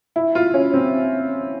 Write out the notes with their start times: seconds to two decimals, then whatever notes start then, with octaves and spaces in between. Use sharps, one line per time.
0.16 E4
0.35 F4
0.54 C#4
0.74 C4